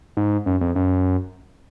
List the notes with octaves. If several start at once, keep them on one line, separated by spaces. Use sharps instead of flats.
G#2
F#2
F2
F#2